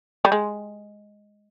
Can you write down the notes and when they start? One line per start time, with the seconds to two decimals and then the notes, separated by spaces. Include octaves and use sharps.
0.25 G3
0.32 G#3